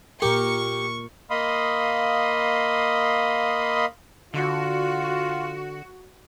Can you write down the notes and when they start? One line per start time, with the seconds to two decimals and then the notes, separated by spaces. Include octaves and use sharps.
0.22 A#2 G4 A#4 C#6
1.30 A#3 D#5 F5 B5 C6 D#6
4.34 D3 F4 F#4